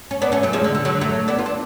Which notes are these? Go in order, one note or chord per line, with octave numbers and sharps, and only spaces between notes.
C#4
B3 D4
A3 C#4
F#3 A3
F3 G#3
D3
D3
D3 F#3
F#3 A3
B3 D4
F4
D4